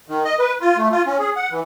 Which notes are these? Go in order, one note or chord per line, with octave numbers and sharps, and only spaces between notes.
D#3
D#5
B4
F4
A3
F4
C#4
G#4
F#5
E3